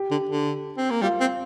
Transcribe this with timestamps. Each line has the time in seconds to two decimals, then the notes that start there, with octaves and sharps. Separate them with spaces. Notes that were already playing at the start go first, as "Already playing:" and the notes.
Already playing: G4
0.11 D3
0.29 D3
0.78 C4
0.90 A#3
1.02 G3 F4
1.20 C4